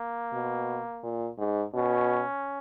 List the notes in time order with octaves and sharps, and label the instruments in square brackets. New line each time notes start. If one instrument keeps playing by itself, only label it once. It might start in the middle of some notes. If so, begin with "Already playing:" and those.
Already playing: [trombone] A#3
[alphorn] B2
A#2
G#2
[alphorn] B2 [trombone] C#4